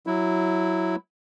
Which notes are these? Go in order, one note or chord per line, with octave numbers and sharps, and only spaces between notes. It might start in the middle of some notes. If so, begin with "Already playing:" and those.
F#3 E4